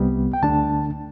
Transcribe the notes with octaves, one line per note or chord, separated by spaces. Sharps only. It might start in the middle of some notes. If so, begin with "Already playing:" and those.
Already playing: C2 C3 G3 B3
G5
D2 D3 A3 D4 A5